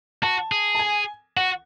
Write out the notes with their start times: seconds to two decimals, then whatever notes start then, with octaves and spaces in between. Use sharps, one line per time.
0.23 F#4 A5
0.52 G#4
0.75 A5
0.79 G#5
1.37 F#4 F#5